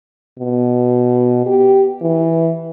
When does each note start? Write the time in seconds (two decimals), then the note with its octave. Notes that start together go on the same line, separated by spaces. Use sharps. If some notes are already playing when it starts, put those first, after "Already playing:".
0.39 B2
1.46 G4
2.01 E3